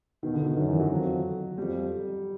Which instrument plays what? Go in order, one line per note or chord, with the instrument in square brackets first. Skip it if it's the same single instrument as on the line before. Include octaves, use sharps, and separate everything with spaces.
[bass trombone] B2 [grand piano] D#3
[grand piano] D3
D3
[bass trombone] F#2 [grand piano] D#3
[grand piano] E3
F#3
[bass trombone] F2
[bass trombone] F2 [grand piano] G3